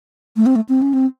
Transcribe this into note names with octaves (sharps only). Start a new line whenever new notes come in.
A3
C4
A3
C4
C#4
C4